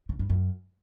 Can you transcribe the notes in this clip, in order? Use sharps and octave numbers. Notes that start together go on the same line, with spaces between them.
C#3
G2
F#2